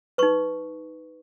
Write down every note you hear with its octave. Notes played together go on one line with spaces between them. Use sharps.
D#4 B4 C#6